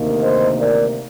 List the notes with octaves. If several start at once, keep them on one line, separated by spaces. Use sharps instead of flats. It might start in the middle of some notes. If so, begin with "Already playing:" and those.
Already playing: D2 C3 D#3 A#3
C5 D#5
A#4 D5